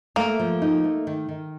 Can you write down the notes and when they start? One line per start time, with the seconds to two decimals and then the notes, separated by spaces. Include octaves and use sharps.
0.16 A3 A#3
0.40 F3
0.62 D#4
0.84 A3
1.07 D#3
1.29 D#3